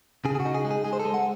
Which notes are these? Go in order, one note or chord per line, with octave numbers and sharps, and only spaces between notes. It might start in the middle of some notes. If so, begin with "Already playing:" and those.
C#3 G#4
G#4
F#4
D#4
G#4
G#3
G#4
G#3 G#4
C5
A4
G#3
F#5